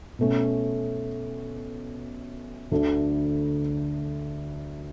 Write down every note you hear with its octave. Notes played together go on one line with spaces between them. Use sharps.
B2 A3 C#4
D2 D3 A3 D4